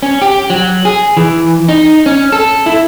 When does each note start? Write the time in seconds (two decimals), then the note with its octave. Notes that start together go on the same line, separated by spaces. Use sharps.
0.03 C#4
0.22 G4
0.50 F#3
0.85 G#4
1.17 E3
1.69 D#4
2.06 C#4
2.32 A4
2.66 E4